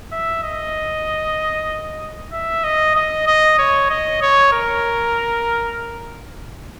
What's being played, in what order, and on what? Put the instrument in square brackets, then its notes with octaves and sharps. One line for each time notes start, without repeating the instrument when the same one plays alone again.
[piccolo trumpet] E5
D#5
E5
D#5
D#5
D#5
C#5
D#5
C#5
A#4